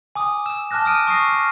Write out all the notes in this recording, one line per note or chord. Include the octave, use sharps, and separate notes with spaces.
G#5 D6 D#6
E6 E7
A5 D6 F6 F#6 A#6
D#6 E6 D7 D#7
C#6 D#6 A#6 C7
F6